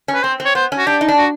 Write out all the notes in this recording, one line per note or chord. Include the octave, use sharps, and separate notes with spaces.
C#4
B4
C4 C5
C4
C#5
B3 C5
C#4
F#4
D4 G4
D#4
D4
F#4